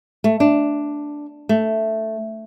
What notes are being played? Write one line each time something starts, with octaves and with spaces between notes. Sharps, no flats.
A3
D4
A3